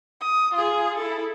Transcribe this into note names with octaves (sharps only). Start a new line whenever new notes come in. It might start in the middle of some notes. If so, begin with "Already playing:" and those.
D#6
F4 G#4
E4 A4